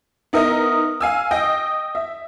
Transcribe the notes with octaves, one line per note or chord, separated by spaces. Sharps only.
B3 D#4 E4 A#4 D#5 E5
F5 G#5 E6
D#5 G5 D#6
E5